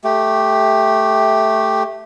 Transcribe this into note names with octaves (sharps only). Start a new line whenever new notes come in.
A3 G4